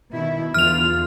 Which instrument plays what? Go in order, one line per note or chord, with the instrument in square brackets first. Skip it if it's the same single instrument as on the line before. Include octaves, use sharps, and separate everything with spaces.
[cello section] B2 D#3 E4
[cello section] E2 D3 F4 [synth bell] F6 F7